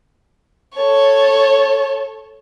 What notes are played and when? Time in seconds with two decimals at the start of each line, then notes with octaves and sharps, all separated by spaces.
0.74 A4 C#5